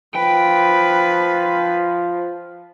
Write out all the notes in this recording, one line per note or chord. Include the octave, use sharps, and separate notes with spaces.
F3 B4 G5